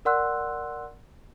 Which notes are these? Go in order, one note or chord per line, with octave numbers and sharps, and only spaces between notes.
A#4 D5 F#5 C6 E6 F#6